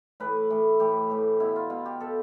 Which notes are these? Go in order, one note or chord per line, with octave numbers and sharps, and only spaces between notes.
A2 E3 B4
A2 E3
A2 E3 G4
A2 E3
B2 E4
F4
B2 F4
G4
B2 A4